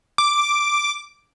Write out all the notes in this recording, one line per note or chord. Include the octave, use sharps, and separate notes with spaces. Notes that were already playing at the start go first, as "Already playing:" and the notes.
D6